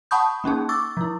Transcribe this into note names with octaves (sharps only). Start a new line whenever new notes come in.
F#5 A5 B5 C#6 D#6 G6
A#3 C#4 D#4 G#4
C#6 D6 E6 A6
F3 E4